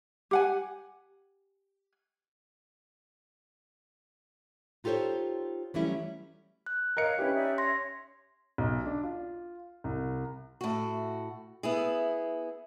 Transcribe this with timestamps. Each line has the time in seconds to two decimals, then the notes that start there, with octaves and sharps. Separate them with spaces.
0.31 G4 F#5 G#5
4.84 D#4 F4 G4 A4 C5 C#5
5.74 E3 F#3 G3 A3 C#4 E4
6.66 F#6
6.97 A#4 C#5 D#5 F5 C#7
7.19 C#4 E4 G4 B4
7.35 D#4 D5 E5
7.58 C#5 E5 C6 A#6
8.58 B1
8.86 D4
9.04 F4
9.84 C2
10.61 A2 F#4
11.63 B3 E4 G#4